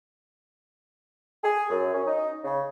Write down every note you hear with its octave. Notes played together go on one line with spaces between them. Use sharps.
G#4
F#2
C#4
D#4
C#3